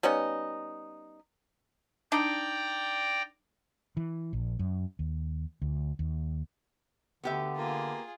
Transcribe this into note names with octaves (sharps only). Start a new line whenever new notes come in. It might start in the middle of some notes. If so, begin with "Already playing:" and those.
G3 B3 C#4 D#4
D4 D#4 D5 G5 A#5
E3
A#1
F#2
D#2
D2
D#2
D2 D3 B3 G4 E5
A#3 F4 G#4